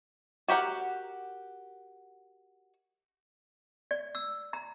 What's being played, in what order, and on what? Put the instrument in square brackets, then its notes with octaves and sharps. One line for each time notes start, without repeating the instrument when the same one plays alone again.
[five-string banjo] F#4 G4 A#4 F#5
[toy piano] D5
E6
A#5